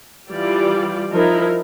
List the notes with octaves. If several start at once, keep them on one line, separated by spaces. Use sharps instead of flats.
E3 G3 F4 G4 D5
F3 D#4 E4 A#4